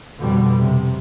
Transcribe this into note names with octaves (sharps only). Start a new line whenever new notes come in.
F2 B2 D3 G3
C3